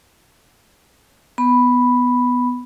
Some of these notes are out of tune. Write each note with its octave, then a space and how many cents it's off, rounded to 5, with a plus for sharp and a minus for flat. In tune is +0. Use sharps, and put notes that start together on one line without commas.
B3 +5 B5 +0